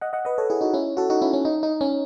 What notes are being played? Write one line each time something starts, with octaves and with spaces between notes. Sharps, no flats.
D#5 F#5
D#5 F#5
B4 D#5
A4 C#5
E4 G#4
D#4 F#4
C#4 E4
F#4 A4
D#4 F#4
C#4 E4
C#4
D#4
D#4
C#4